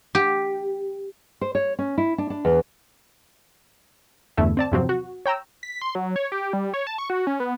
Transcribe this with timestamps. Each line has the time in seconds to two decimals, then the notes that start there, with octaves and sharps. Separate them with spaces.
0.15 G4
1.41 C5
1.55 C#5
1.79 C#4
1.98 E4
2.18 D4
2.30 D4
2.45 E2
4.37 E2 G2 D3 A3 E4 E5
4.57 C4 D5 A5
4.72 E2 G2 C3 F3 F#3 C4
4.89 F#4
5.26 C#5 G5 A#5 E6
5.63 B6
5.82 C6
5.95 F#3
6.16 C#5
6.32 G4
6.53 G3
6.74 C#5
6.87 A5
6.98 C#6
7.10 F#4
7.27 C#4
7.40 B3